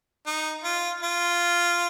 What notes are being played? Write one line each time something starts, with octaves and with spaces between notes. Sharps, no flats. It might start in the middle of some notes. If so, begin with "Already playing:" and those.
D#4
F4
F4